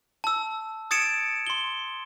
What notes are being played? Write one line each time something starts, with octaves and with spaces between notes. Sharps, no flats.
A5 E6
D#6 G#6 A6 C#7 D7 E7
C6 G7